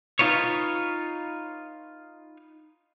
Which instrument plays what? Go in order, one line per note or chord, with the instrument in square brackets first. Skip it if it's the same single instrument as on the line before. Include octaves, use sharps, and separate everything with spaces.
[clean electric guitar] D#4 F4 B4 C#5